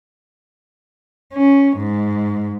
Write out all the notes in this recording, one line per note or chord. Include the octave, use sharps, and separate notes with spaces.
C#4
G#2